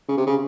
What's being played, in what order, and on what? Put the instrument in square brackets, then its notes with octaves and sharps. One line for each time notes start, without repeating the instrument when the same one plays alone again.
[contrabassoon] C#3
C3
C#3